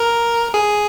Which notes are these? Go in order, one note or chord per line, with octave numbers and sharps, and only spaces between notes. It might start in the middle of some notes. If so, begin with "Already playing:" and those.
Already playing: A#4
G#4